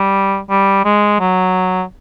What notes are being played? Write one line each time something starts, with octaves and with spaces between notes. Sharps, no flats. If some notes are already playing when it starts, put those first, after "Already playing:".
Already playing: G3
G3
G#3
F#3